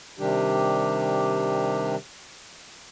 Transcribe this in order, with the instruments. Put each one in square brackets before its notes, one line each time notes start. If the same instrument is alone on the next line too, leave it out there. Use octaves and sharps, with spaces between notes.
[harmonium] C3 D#3 G3 D4 G4